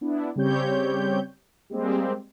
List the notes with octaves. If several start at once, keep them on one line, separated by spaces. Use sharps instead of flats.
B3 D4 E4
C#3 G3 C4 G4 C#5 G6
G3 G#3 A#3 C4 G4